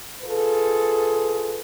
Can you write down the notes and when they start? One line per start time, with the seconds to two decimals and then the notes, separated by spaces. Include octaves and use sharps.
0.23 F4 G#4 A4 B4